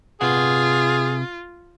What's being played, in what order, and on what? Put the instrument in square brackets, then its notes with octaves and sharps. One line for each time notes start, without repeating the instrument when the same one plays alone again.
[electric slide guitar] C3 B4 F#5 [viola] F4 [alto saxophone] G#4